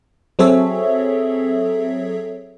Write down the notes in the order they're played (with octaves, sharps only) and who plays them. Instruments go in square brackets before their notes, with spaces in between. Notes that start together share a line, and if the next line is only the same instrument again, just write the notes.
[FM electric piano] F#3 C4 G#4 A4 C#5 E5